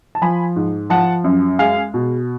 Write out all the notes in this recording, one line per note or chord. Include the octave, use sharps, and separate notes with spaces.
A5
F3 G#5 B5
G#2
F3 F#5 A5
F#2
G#3 F5 G#5
B2